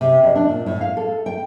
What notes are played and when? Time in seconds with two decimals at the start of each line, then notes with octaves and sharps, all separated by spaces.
0.01 C3
0.23 F2
0.35 D4
0.49 A#2
0.66 A2
0.81 F5
0.97 A4
1.26 G5